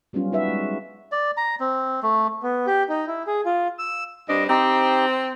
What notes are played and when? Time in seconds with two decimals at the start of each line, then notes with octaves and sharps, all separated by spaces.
0.13 F#3 G3 B3 C#4 F4
0.32 D#4 F#4 B4 E5
0.48 G#3
1.12 D5
1.37 A#5
1.60 C4
2.03 A3
2.43 B3
2.67 G4
2.89 D#4
3.07 E4
3.27 G#4
3.46 F4
3.78 E6
4.28 G2 C4 D4 D#5
4.49 C4 D#4 G4